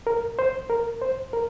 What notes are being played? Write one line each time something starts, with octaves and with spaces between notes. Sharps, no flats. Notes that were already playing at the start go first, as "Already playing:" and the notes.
A#4
C5
A#4
C5
A#4